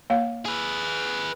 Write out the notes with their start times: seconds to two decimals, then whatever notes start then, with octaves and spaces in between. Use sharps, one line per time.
0.10 A#3 C#5 F5
0.45 G#4 B4